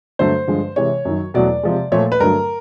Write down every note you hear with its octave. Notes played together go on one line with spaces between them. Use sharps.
G2 D3 F#3 A3 C5
G2 D3 F3 G#3
C3 E3 G#3 C#5
F#2 D#3 F#3
E2 B2 F#3 A3 D5
C3 F3 G#3
A#2 F3 A3 C#5
B4
G2 D3 F#3 A3 A#4